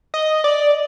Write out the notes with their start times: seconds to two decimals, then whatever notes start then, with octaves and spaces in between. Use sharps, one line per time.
0.14 D#5
0.44 D5